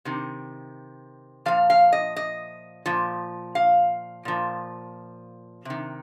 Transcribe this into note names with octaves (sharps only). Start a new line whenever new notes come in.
C3 D#3
A#2 F3 F5
F5
D#5
D#5
A#2 F3
F5
A#2 F3
C3 D#3